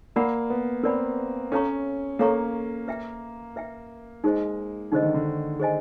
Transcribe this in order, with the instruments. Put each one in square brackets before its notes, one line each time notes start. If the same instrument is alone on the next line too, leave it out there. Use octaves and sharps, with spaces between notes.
[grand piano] A#3 [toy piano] A#4 D5 F#5 B5
[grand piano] B3
[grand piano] C4 [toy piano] A#4 D5 F#5 B5
[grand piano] C#4 [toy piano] A4 C#5 F5 A#5 C#6
[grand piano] A#3 [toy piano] A4 C#5 F5 A#5 C#6
[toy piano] B4 E5 G5
B4 E5 G5
[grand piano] G#3 [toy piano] D#4 G#4 C5 D#5
[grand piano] D3 [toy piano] D#4 G#4 C5 D#5
[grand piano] D#3
D3
[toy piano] G#4 C5 D#5 G#5